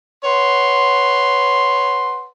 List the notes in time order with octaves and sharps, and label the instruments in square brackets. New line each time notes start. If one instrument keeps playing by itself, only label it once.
[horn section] B4 C#5 F#5 C6